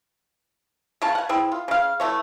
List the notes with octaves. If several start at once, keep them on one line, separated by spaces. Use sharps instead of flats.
C#3 C#5 F5 A5
F#5 G#5
C4 E4 G#4
F4
C#3 F5
E3 A3 C#5